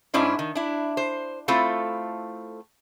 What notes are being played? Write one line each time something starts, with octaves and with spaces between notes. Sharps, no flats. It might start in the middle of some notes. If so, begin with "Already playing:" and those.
G#2 C#4 D4 E4 C5
D#3
D4 E4
C5
A3 C4 E4 F4 A4